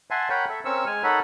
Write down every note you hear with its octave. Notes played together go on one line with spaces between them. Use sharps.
E5 F#5 G#5 A5 C6
A#4 C#5 F#5 G5 B5
A4 E5
C4 C#4 A#4 C#6 E6
G#3 G#5 F6
D#4 A4 A#4 C#5 F#5 B5